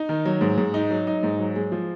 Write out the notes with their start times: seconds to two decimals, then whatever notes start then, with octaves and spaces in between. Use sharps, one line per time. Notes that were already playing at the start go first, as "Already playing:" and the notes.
Already playing: D#4
0.09 D#3
0.25 F#3
0.41 G#2
0.58 G#2
0.74 D#4
0.90 F#3
1.07 D#4
1.23 G#2
1.39 F#3
1.55 G#3
1.72 F3